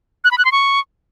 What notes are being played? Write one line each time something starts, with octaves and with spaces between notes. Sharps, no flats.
F#6
B5
F#6
C6
C#6